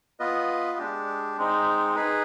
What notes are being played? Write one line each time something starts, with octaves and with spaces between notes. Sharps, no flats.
B3 F4 B4 D#5
G#3 D4 G4
G#3 C4 D#4
D#4 G#4 B4